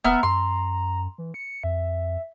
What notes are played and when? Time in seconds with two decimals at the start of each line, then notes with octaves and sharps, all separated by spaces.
0.04 D#1 B3 E5 A#5 F6
0.23 F#2 C6
1.18 E3
1.34 C#7
1.64 F2 E5